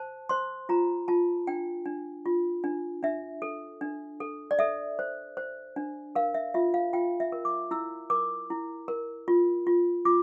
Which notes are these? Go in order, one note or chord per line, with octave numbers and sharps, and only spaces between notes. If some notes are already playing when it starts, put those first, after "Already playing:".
Already playing: C5 A5
C5 C6
F4 A#5
F4 A5
D4 G5
D4
F4
D4
D4 E5
A4
D4
A4
D5
A4 E5
C5
C5
D4
A#4 F5
E5
F4 E5
F5
F4 G5
E5
A#4
D6
E4 E6
A#4 D6
E4
A#4
F4
F4
F4 D6